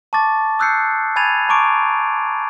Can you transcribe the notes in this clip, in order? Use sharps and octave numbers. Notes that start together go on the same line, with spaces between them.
A5 C#6 D6 A6
D#6 E6 F#6 G6 C7 C#7
G#5 B5 G#6 A6 D#7 F7
A5 A#5 C#6 D6 D7